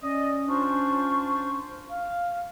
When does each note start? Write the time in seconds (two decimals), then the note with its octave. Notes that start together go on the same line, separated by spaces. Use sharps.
0.03 C#4 D5 D#5
0.48 D4 F4 C5 C#6
1.89 F5